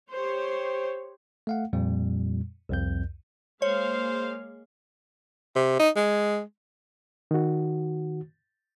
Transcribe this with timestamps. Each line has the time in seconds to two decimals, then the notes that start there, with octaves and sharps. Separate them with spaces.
0.11 G4 C5 C#5
1.47 A3 F5 F#5
1.73 F2 A#2 G3
2.69 C2 F2 G6
3.62 G#3 A#3 C5 C#5 F5
5.56 C3
5.79 D#4
5.96 G#3
7.31 D#3 F#4